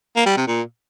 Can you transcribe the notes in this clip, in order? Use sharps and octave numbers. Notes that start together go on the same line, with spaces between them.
A#3
G3
C3
A#2